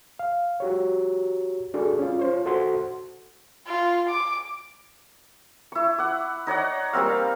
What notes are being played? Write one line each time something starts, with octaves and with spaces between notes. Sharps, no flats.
F5
F#4 G4 C#5
D4 F#4 G#4 A4
C#4 F4
F4 C5 C#5
F#4 A4 C5 F#5 C6
F4
D6
E4 C#6
F#5 D6
D#4 C#5 D5 F#5
G3 A#3 C4 F5